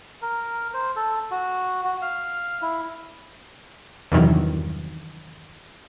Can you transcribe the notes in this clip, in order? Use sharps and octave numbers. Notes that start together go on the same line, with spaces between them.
A#4
C5
A4
F#4
F#4
F5
E4
E2 G2 C3 D#3 E3 F#3